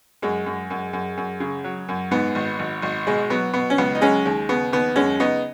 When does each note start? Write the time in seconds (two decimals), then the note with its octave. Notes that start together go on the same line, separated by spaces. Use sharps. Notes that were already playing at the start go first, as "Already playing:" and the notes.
0.22 F#2 G#3
0.46 F#2
0.70 F#2
0.93 F#2
1.17 F#2
1.40 C#3
1.64 F#3
1.88 F#2
2.11 G#2 B3
2.35 G#1
2.59 G#1
2.82 G#1
3.07 B2 G#3
3.30 F#3 B3
3.54 B2 B3
3.70 C#4
3.78 C#2 B3
3.95 D#4
4.01 F#3 G#3 C#4
4.25 D#2 G#3
4.49 C#3 B3
4.72 D#2 B3
4.96 F#2 G#3 C#4
5.20 C#3 B3 D#4